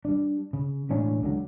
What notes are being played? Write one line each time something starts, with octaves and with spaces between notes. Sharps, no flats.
G3 D4
C#3
E1 A2 C#4 D4
C#2 D3 F#3